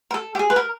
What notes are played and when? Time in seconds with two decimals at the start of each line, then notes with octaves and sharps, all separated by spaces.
0.11 A#4
0.14 A4
0.35 G4
0.39 G#4
0.50 B4
0.56 A#4